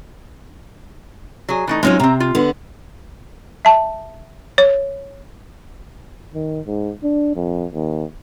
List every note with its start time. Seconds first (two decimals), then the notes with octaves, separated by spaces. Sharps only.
1.49 F#3 G#4
1.67 E3 A3 D#4
1.83 F#3 G#3 C4 C#4 D#4 F4
2.00 C3 C4 A#5
2.20 F4
2.35 D3 B3
3.65 E5 A5
4.58 C#5
6.35 D#3
6.66 G#2
7.03 D4
7.36 F2
7.74 D#2